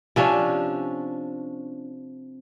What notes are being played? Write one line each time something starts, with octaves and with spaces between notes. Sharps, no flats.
C3 F3 C#4 D4